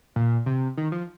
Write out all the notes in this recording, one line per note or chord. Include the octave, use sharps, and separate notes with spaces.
A#2
C3
D#3
F3